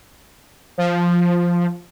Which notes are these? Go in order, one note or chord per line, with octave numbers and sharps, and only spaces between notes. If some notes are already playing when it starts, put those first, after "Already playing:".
F3